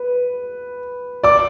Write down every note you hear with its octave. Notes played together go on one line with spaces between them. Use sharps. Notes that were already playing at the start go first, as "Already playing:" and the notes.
Already playing: B4
D5 D6